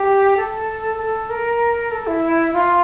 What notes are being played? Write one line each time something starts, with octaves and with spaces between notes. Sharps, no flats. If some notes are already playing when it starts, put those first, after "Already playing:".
Already playing: G4
A4
A4
A#4
A4
E4
F4